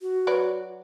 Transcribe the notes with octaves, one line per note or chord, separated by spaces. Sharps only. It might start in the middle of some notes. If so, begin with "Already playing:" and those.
F#4
F#3 B4 D5